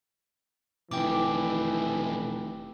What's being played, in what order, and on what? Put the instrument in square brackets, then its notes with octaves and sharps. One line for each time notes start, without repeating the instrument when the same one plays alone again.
[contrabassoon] F1 [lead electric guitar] B2 D#3 [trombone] E3 [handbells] G5 D6